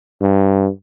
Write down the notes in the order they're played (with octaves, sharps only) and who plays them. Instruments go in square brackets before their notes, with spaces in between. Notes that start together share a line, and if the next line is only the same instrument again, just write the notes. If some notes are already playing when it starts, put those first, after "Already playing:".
[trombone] G2